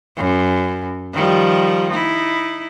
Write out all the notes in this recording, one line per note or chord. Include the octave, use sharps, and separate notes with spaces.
F#2
D#3 F3 G3
D#4 E4